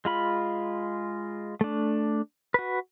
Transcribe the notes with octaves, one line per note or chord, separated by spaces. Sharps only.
G#3 F4 B5
A3 D4
F#4 B4